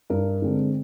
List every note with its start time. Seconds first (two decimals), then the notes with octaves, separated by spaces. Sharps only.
0.10 G2 A#4
0.42 D3 G#3 C4